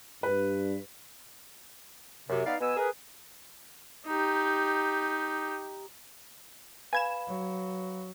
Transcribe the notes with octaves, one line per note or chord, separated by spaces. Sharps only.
G2 B4
F#2 C3
B3 D#4 D5 F5
B2 B3 G#5 E6
G#4 A#4 B4
D#4 G4
B4 F5 G#5 B5 G#6 E7
F#3